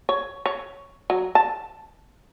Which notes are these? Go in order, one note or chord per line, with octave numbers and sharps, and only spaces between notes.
C#5
C#5
F#3
A5